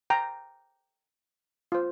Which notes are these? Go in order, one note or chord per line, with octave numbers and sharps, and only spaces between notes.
G5 A#5
F4 C5